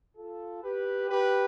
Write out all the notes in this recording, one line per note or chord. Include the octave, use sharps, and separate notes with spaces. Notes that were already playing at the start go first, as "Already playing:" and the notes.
F4 A4
G4 B4
G4 B4